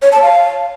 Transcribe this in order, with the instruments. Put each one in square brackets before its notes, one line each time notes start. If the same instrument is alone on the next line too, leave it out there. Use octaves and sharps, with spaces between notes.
[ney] C#5
A5
F5